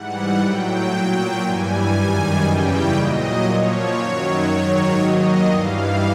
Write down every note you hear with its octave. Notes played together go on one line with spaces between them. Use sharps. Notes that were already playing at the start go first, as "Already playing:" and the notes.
Already playing: G#2 E3 G3 F#5
A2 F#3 G5
A#2 F#3
G2 E3 G3 G#5
F#2 D#3 G3 G#5
E2 C#3 E3 G3 G5
A#2 F#3 D#5
A#2 F3 C#5
F#2 D#3 F#3
G#2 D#3 F#3
D#2 D#3 F#3 D#5
G2 E3 G3 F5